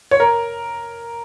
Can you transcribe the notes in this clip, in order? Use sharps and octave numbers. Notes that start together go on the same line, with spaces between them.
C#5
A#4